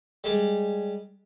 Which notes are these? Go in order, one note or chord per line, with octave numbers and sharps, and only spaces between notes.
G3 G#3